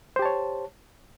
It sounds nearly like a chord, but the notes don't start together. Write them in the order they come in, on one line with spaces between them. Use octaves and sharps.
C5 G4 A5 C#5